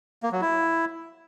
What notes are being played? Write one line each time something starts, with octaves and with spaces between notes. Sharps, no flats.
A#3
F#3
E4